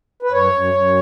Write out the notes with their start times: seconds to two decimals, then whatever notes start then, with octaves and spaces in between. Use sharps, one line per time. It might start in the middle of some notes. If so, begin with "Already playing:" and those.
0.23 B4
0.32 F#2 C#5
0.52 F#2
0.74 F#2